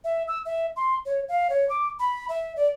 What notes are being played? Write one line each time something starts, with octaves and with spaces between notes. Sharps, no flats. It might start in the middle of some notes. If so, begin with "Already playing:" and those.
E5
E6
E5
C6
C#5
F5
C#5
D6
B5
E5
D5